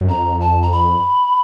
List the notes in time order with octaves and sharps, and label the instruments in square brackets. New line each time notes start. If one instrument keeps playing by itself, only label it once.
[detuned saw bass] F#2
[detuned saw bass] F2 [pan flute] A#5
[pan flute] A5
A#5
B5